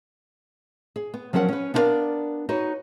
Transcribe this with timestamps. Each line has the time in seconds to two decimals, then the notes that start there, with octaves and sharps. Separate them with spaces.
0.96 G#4
1.14 B3
1.33 F3 F#3 C#4 A#4 F#5
1.49 C#4 B4
1.74 B3 D4 E4 A#4 D5 F5
2.49 D#4 F#4 B4 C#5